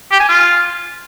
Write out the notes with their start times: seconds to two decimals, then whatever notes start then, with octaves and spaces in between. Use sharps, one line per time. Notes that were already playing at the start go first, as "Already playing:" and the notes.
0.12 G4
0.20 G#5
0.29 F4